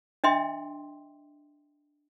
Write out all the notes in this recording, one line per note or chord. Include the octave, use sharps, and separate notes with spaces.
D4 D#5 E5 G5 C6